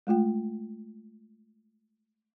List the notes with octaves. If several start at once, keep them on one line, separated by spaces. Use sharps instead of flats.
G#3 A3 F4 G5